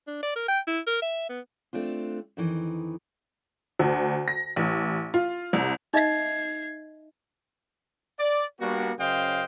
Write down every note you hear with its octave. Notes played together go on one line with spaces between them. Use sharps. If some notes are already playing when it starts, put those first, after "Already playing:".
D4
D5
A#4
G5
E4
A#4
E5
B3
A3 C4 D4 F4
F2 D#3 E3
D2
A#6
A1
F4
C2
D#4 D#5 E5 G#6 C7
D5
G3 A#3 B3 D4 F#4
F#2 C#3 C5 D#5 F5 G5